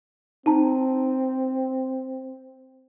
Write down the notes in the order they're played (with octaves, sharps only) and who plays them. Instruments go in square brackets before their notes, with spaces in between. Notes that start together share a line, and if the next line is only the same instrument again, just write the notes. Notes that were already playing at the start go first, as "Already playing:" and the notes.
[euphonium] C4 [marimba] D#4 A5 A#5